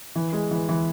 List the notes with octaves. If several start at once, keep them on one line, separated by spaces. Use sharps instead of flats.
E3
G#3
E3
E3